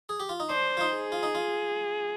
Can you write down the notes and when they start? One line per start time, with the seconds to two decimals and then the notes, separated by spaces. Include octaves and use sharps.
0.09 G#4
0.20 G4
0.29 F4
0.40 D#4
0.49 D4 C5
0.77 F4
0.81 D#4
0.96 G#4
1.12 F4
1.23 D#4
1.35 F4